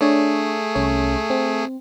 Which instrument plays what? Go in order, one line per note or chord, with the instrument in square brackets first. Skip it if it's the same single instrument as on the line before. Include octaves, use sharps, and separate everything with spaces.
[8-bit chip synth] A3 G#4 [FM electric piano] D4 C#5 D5
[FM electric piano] C2 C#4 C#5
C4